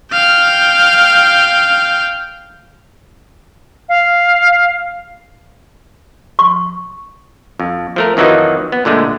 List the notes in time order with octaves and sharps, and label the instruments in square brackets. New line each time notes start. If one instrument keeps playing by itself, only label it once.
[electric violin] F5 G5
[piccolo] F5
[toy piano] C#6
[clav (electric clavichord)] F2
F3 A3 A#4
F2 D#3 E3 F#3 D#4
B3
A#2 D3 G#3 A3